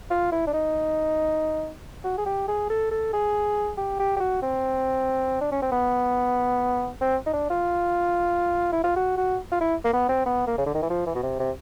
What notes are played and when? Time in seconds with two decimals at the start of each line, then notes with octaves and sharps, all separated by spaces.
0.10 F4
0.32 E4
0.47 D4
0.53 D#4
2.04 F#4
2.18 G#4
2.26 G4
2.48 G#4
2.70 A4
2.91 A4
3.13 G#4
3.77 G4
3.99 G4
4.16 G4
4.20 F#4
4.42 C4
5.41 D4
5.51 C#4
5.62 C4
5.72 B3
7.01 C4
7.26 D#4
7.33 D4
7.50 F4
8.72 E4
8.83 F4
8.96 F#4
9.17 F#4
9.51 F4
9.60 E4
9.84 A#3
9.93 B3
10.09 C4
10.26 B3
10.47 A#3
10.58 C#3
10.66 D3
10.74 D#3
10.82 E3
10.90 F3
11.06 E3
11.15 B2
11.23 C3
11.39 C3